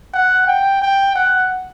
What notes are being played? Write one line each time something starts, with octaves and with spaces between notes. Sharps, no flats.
F#5
G5
G5
F#5